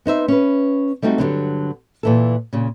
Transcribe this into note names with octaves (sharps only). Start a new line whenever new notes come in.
B3 D#4 C5 E5
C#4 B4
G3 A3 C4 D#4 F#4
G2 A#2 D3 F#3
A#2 E3 A4
A#2 C#3